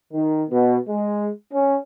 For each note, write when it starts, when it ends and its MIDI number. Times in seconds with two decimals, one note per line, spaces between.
0.12 0.43 51
0.49 0.76 47
0.88 1.27 56
1.52 1.75 61